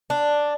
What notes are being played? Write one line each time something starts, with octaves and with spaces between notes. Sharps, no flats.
D4